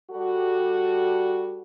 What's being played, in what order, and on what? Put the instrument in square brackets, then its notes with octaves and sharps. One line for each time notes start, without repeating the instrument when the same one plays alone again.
[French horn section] G3 F#4 A4